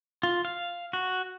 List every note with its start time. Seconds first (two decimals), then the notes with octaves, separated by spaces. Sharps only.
0.23 F4
0.45 F5
0.93 F#4